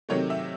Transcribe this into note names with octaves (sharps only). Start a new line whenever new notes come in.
C3 D#3 F#3 A3 C#5
E5